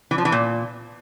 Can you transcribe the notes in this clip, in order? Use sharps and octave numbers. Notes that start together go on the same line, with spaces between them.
E3
F3
E3
A#2